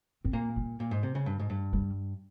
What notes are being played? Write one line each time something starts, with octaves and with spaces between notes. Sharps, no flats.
C4
A#2 A#3
G3
A#2
G#2
C3
C#3
G2
G#2
G2
G3